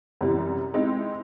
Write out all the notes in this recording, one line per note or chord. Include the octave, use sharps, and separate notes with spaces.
F#2 C3 E3 G3
G#3 C4 D#4 E4